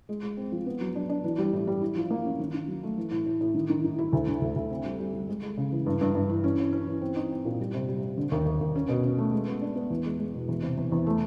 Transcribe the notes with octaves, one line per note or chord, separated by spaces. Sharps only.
G#3
G#3
C4
F3
B3
F#3
D4
D4
E3
G3
A2
G3
E4
F3
A#3
C#4
D#3
D#3
F#3
A3
E3
A2
A2
A2
D#3
D#3
D#3
E4
D2
D3
D2
D2
C4
G3
G3
G3
G#3
G#3
C#3
E3
G2
G2
G2
E3
C#4
C#4
C#4
E3
C4
D#4
C4
A#2
G3
C3
G3
C3
D3
D#2
D#2
D#2
C#4
B2
C#4
A3
G#3
B3
D4
B3
E2
G#3
G#3
B2
E2
C3
E2
E2
A3